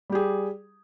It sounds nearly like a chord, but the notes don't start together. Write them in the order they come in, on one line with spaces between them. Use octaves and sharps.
G3 G4 G#4